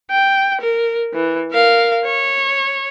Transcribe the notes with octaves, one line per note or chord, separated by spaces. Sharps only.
G5
A#4
E3
A#4 F5
C#5